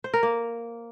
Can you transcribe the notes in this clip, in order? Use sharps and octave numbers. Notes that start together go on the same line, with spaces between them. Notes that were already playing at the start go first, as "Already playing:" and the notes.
C5
A#4
A#3